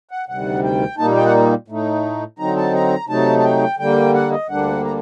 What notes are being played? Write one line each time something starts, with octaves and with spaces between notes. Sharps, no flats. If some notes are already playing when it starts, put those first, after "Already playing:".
F#5
D2 C3 D#3 G3 F#5
G5
A#2 G3 A#3 D#4 A5
G5
F#5
A2 A3 D#4
D3 F#3 C4 D#4 A#5
A5
A#5
C3 F#3 A3 D#4 A5
A5
G5
D3 G3 A#3 G5
F#5
D#5
D2 D3 G3 A#3 D4 F#5
A#5